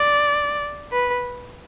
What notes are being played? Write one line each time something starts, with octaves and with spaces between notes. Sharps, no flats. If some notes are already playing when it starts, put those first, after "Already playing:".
Already playing: D5
B4